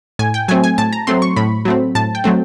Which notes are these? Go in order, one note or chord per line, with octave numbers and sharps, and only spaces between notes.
A2 G#5
G5
F#3 A3 C4 G#5
G#5
A2 A5
A#5
F#3 A3 C4 C6
C#6
A2 B5
F#3 A3 C4
A2 A5
G5
F#3 A3 C4